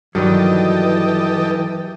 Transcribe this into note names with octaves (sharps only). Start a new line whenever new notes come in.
G2 D#3 E3 F#3 G3 G4 A4 D#5